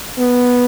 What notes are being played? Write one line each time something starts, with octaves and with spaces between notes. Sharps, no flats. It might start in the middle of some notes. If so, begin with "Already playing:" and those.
B3